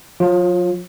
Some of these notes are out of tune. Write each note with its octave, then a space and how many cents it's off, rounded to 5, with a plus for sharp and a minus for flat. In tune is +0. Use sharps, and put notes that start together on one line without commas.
F#3 -40 F4 +15